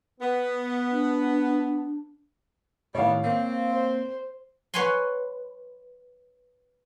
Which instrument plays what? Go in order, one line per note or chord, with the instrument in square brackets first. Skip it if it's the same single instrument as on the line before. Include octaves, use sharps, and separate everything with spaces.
[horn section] B3
[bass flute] D4
[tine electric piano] A2 D#3 [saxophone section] G3 B3 [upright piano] C#5 F5
[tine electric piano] A#3 [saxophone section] C4
[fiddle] C5
[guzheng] B4 C#5 F#5 G#5 B5 C6